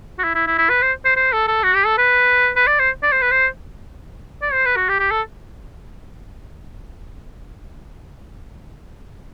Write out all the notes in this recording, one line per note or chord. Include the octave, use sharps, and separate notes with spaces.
F#4
E4
E4
E4
E4
B4
C5
C5
C5
A4
A4
F#4
G4
A4
B4
B4
D5
C5
D5
C5
B4
C5
D5
C5
B4
F#4
G4
G4
A4